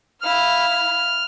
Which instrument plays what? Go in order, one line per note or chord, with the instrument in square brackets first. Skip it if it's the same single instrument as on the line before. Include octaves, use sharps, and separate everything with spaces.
[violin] E4 F5 [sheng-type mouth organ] F6